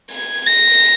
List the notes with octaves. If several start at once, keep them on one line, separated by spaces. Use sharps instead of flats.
G#6
A#6